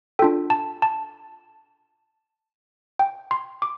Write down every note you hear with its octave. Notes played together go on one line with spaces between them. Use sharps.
D4 F4 A4 G5
A5
A5
G5
C6
D6